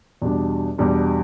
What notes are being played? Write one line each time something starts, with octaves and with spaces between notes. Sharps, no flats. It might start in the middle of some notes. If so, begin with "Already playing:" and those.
E2 B2 G3 D4
E2 B2 G3 D4